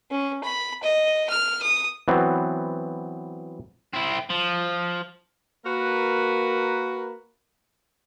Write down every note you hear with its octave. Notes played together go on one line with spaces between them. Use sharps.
C#4
B5
D#5
F6
D#6
E3 F#3 B3 C4
C4 E4
F3
A#3 F#4 A#4 B4